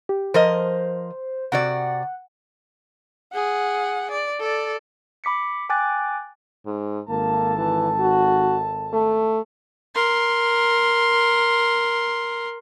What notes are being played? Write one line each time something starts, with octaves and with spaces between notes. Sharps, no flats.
G4
F3 A#4 C5 D#5
C3 F#4 D5 F#5
G#4 F#5
D5
A4 D5
B5 D6 B6 C#7
G5 G#5 D6 F#6 A6
G#2
G#1 A#3 A4 A5
E3
F#4
A3
A#4 C6